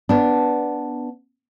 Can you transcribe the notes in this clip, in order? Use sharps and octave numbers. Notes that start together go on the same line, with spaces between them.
B3 D4